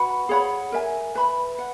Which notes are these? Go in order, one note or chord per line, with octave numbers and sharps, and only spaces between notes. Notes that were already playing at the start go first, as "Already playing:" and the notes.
Already playing: F#4 B4 F#5 B5
G#4 C#5 F#5 B5
A#4 E5 G#5
B4 E5 B5
F#5